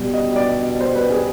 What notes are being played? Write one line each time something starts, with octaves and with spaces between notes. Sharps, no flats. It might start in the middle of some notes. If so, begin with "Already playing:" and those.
Already playing: B2 G3 B3
D#5
D5
C5
B4
G#4